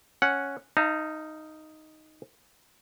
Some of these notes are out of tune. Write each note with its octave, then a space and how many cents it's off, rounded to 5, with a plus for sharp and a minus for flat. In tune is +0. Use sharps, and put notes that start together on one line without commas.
C#4 +0 F#5 +0
D#4 +0 F5 -35 A5 +40